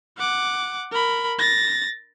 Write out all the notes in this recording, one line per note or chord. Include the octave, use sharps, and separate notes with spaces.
F#5 D6
A#4 B5
A6 A#6